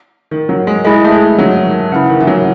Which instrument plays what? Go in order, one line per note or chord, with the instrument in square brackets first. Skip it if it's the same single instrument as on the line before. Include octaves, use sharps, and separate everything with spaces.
[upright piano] D#3
F#3
G#3
[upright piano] G#3 [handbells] E4 G#4 D#5
[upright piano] A3
G#3
F#3
D#3
[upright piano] C#3 [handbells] E4 B4 F#5
[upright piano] D#3
E3
F#3